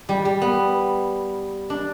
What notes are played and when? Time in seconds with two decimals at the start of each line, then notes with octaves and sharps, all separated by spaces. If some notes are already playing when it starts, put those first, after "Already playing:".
0.09 G3
0.25 G3
0.42 B3
1.70 D4